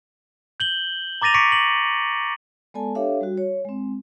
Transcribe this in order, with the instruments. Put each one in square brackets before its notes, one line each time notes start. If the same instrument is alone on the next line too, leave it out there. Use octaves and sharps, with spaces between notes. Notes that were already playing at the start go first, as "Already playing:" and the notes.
[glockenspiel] G6 F#7 G7
A#5 D6 A6 A#6 D#7 F7
C#6 D6 B6 C#7 D7
F#7
[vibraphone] G#3 B3 A4 D5 G#5 A5
D4 G4 A4 C#5 E5 F5
G3 F#4
C#5
G#3 C4